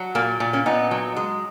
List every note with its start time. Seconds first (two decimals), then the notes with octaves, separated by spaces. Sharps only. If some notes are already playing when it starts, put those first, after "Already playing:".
Already playing: F#3
0.15 A#2 A#3
0.40 A#2
0.53 A#3 C#4
0.66 A#2 B3 D#4
0.91 F#3
1.16 G#3